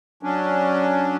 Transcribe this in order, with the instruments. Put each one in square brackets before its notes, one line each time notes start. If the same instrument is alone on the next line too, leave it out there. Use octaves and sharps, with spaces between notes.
[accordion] F#3 C#4 D4